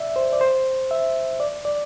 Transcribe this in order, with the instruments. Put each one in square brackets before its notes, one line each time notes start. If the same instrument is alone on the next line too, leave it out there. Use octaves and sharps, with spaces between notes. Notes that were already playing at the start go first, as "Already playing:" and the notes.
Already playing: [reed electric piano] D5 E5
C5
D5
C5
E5
D5
D5